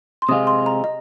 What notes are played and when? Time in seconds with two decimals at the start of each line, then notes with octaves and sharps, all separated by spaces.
0.22 C6
0.28 C3 G#3 F4 D#6
0.47 C6
0.66 A#5
0.84 D#5